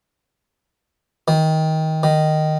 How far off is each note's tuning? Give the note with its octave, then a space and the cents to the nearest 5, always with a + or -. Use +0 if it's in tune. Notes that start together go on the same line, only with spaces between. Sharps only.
D#3 +20
D#3 -10